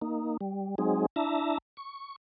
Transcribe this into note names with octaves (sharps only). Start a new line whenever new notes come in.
A#3 D#4
G3
F#3 G#3 C4 D#4 G#4
D4 E4 E5 A5 A#5
C#6